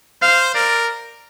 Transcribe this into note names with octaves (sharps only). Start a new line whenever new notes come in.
C5 F5
A#4 D5